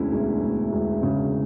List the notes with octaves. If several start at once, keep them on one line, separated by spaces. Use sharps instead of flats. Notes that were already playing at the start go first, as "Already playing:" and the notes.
Already playing: E1 D2 C#4 E4
E1
E1
E1
C#3